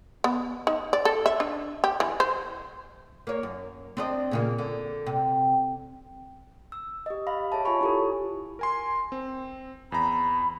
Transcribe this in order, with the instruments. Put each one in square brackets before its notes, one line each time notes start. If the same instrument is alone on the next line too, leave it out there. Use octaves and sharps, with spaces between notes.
[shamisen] B3
D#4
D5
A4
E5
D4
G4
E3
C5
[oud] A#3 C#5
F#2
C4 D4 D#5
A#2 C#3 A#3
D3
C3
[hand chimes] E6
G4 D#5
F5 B5 A#6
G#4 C#5 E5 A5
F4 C#5 G#5 A5 B5 C#6
E4 G4 A4
[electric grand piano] A#4 G#5 C6
C4
[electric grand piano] E2 A#5 [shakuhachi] B5